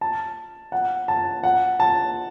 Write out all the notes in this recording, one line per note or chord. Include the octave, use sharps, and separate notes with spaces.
A5
F#5
A5
F#5
A5